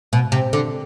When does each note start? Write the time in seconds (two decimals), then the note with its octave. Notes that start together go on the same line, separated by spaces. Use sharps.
0.13 B2
0.32 C3
0.53 D3